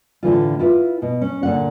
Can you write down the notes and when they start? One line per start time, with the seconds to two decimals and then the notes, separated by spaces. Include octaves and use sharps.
0.23 A2 D3 E3 F4
0.59 E4 F4 B4
1.02 B2
1.21 C#4
1.43 A#2 D3 F#5